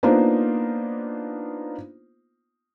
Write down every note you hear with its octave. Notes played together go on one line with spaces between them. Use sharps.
A#3 B3 D4 D#4 F4 C5